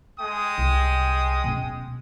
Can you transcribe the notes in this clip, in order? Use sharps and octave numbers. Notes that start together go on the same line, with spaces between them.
G#3 G5 D#6
C2
B2 C#4